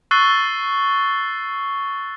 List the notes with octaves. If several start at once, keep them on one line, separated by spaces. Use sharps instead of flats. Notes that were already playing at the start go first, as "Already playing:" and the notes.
C#6 E6 F#6 A6 C7 G7